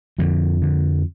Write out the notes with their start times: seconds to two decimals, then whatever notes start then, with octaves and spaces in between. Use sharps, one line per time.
0.19 F2 D3 F3
0.62 D3